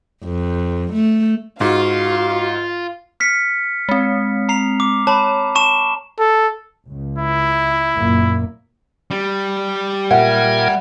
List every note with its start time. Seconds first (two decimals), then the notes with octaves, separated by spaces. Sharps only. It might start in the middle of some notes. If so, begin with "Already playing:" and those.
0.24 F2
0.93 A3
1.61 G#2 F4 F#4 F5
3.20 F6 B6 C#7
3.89 G#3 C4
4.49 A#5 C7 F7
4.80 D6
5.07 C#5 A5 B5
5.55 A5 C#6 E7
6.20 A4
6.88 C#2
7.18 E4
7.95 F#1 A#2 A#3
9.11 G3
10.11 A#2 A#4 E5 F#5 G#6